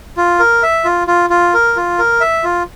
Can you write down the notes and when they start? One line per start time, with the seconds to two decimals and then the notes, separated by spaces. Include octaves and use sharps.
0.17 F4
0.39 A#4
0.63 E5
0.85 F4
1.07 F4
1.30 F4
1.54 A#4
1.76 F4
1.98 A#4
2.21 E5
2.44 F4